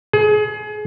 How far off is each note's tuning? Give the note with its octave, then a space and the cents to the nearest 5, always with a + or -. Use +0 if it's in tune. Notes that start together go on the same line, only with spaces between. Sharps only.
G#4 +30